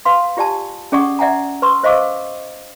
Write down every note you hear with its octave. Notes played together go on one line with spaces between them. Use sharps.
B4 F5 C6
F4 G4 D5 G#5 A5
C#4 G#4 D5 F#5 C#6 D#6
D5 E5 F#5 G#5 A#5
B4 C6 C#6 E6
C5 D#5 F5 C#6 D6 E6